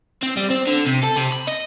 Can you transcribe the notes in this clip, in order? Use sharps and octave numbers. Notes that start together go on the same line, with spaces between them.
C4
G3
C4
D3
C3
A4
C3
B5
D#5